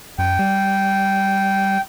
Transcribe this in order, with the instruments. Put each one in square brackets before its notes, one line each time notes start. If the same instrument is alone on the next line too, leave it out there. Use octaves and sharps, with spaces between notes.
[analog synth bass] F#2 [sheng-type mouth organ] G5
[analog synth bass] G3